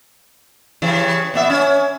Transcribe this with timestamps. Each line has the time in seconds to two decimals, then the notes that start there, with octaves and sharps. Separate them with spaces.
0.82 C#3 E3 G3
1.34 A#2 B3 E5
1.50 C#4